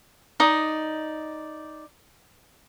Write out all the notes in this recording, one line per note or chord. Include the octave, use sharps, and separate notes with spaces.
D#4 D5 D#6